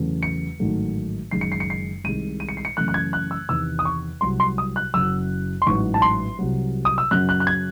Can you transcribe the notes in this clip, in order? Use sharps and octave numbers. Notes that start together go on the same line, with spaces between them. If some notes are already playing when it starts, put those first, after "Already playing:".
Already playing: E2 C#3 F#3 A3
C#7
A1 G#2 D#3 F#3 A3
F#1 F#2 D#3 G#3 C7
C#7
C7
C#7
C7
C2 C3 D#3 G#3 D#7
D#7
C#7
C7
C#7
F#2 C#3 E3 A3 F#6
F#6
G#6
F#6
E6
E2 C3 D#3 E6
D#6
C#6
C2 C3 F#3 C6
C6
D#6
F#6
F#1 F#2 C#3 F#3 E6
C6
A1 G#2 F#3 C#6
A5
C6
C2 C3 F#3
D#6
E6
F#2 C#3 F#3 F#6
F#6
F#6
G#6